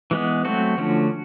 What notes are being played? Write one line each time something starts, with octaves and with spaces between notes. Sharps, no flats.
E3 G#3 B3
F#3 A3 C4 F#4
D3 F3 A3 C#4